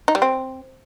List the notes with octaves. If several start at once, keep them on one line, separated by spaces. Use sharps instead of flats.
D#4
G3
C4